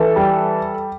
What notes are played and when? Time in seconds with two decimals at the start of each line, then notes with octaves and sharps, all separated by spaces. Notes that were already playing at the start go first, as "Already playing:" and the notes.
Already playing: E3 A4
0.16 G3